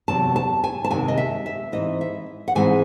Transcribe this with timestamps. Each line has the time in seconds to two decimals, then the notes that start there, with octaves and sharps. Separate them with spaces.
0.08 E2 C3 F#3 A5
0.36 A5
0.64 G#5
0.85 A5
0.91 E2 C3 D#3 G#3 G#5
1.08 D#5
1.17 E5
1.46 E5
1.72 G#2 E3 C4 D#5
2.01 E5
2.48 F#5
2.55 G#2 E3 G#3 C4 G#5